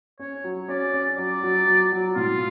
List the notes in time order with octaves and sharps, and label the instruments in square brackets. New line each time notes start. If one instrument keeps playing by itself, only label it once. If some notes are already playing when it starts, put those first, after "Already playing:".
[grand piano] C#4 [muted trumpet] C#5
[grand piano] F#3
[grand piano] C#4 [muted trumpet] D5
[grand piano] C#4
[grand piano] F#3 [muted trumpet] D5
[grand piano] F#3
F#3
F#3
[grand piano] A2 [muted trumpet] F4